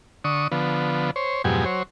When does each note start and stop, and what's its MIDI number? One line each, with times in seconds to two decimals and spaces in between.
0.24 0.48 50
0.24 0.48 85
0.24 0.48 87
0.52 1.11 50
0.52 1.11 53
0.52 1.11 59
1.16 1.42 72
1.16 1.42 73
1.44 1.65 41
1.44 1.65 44
1.44 1.65 47
1.44 1.65 54
1.44 1.65 67
1.44 1.65 80
1.65 1.83 54
1.65 1.83 72
1.65 1.83 73